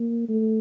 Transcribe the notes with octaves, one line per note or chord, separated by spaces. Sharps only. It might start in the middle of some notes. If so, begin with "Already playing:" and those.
Already playing: A#3
A3